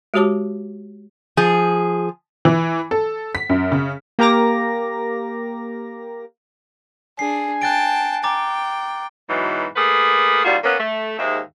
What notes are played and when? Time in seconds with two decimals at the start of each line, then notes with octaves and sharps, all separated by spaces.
0.14 G#3 F#4 G4 C#5 A5 D6
1.37 F3 G#4
2.45 E3
2.91 A4
3.35 B6
3.50 F#2
3.72 C#3
4.19 A#3 G4 A#4 A#5 D6 A#6
7.19 D4 G#4 G#5 C7
7.62 G5 A5 F#6 A6 D7
8.23 G5 A#5 D6 A6
9.29 G#2 B2 E3 F#3
9.76 A3 A#3 G#4 B4
10.45 D#2 G3 F4 F#4
10.64 A#3 B3 C#4
10.79 A3
11.18 D#2 G#2 G#3 E5